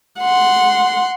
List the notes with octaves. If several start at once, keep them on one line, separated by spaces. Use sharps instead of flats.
F#5 C6